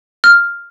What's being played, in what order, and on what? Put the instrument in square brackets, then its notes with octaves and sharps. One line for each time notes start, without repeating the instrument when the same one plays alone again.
[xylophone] F6